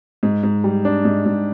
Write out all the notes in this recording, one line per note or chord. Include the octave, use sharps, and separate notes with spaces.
G#2
G#2
G3
D4
G#2
G#2